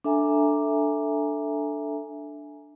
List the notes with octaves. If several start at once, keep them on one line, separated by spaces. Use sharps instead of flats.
D4 A4 E5 G#5 A#5